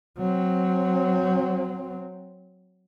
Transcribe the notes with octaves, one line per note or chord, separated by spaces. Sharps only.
F#3 C4